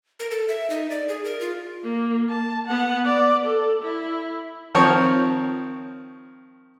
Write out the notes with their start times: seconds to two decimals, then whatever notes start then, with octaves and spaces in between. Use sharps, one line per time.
0.20 A#4
0.31 A4
0.49 E5
0.70 D#4
0.90 D5
1.09 G#4
1.25 A#4
1.41 F4
1.84 A#3
2.29 A5
2.68 B3 F#5
3.06 D5
3.45 A4
3.82 E4
4.75 D#3 F3 C4 A#4 C#5